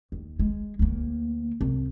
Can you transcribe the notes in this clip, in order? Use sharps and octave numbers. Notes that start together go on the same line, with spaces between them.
D#2
G#3
D2 A#3
C2